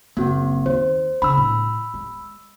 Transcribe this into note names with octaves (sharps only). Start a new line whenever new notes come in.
F#1 A#3 C4 F#4
D#2 C5
C#3 D4 B5 E6
A2
G#3